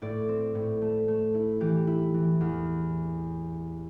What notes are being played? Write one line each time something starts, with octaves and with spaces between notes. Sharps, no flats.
A2 D5
C4
A2
A3
A3
E4
E3 G4
E4
E3
E2